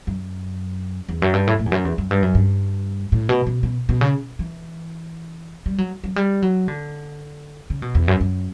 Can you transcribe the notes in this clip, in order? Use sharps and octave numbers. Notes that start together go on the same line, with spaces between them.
F#2
E2
F#2
G2
A2
A2
E2
F#2
E2
F#2
G2
F#2
G2
A2
B2
B2
B2
B2
C#3
E3
G3
F#3
F#3
G3
F#3
D3
C#3
B2
E2
F#2
F#2